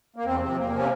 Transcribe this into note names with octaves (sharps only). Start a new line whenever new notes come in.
A#3
E2 C4
C3 C4
F3
E2 A#3
C3 F3 C#4